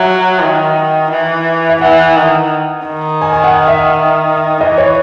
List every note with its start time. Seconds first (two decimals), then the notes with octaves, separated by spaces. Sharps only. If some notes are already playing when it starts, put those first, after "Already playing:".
Already playing: F#3 E5
0.41 D#3
1.11 E3
1.69 E5
1.81 E3 F#5
2.16 D#3
2.86 D#3
3.22 G#5
3.33 G#5
3.44 F#5
3.68 E5
4.61 E3 D#5
4.78 C#5